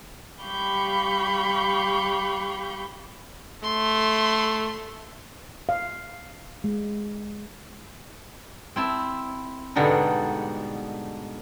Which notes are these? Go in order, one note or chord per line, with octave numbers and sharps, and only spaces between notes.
G3 G4 F5 B5 C#6 G6
A3 C6
F5
G#3
C4 E4 A5
G#2 B2 D3 G3 B3 D#4